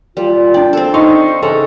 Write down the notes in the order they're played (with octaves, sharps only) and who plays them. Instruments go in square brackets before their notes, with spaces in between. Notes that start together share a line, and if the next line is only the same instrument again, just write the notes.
[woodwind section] A#2 F4 [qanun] G3
[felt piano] D4 G5 [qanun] D5
[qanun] C4 A4
[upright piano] D#4 [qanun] F5 [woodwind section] C6 C#6
[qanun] C#3 [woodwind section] E3 [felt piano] A4